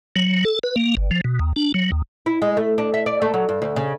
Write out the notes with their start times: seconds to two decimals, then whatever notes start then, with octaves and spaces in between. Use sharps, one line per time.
0.16 F#3
0.45 A4
0.63 B4
0.76 A#3
0.97 G1
1.11 F3
1.24 B2
1.39 D#2
1.56 D4
1.74 F#3
1.92 D#2
2.26 E4
2.42 G#3
2.57 A3
2.78 D4
2.94 E5
3.06 D5
3.22 A3
3.34 F#3
3.49 G2
3.62 D2
3.76 C#3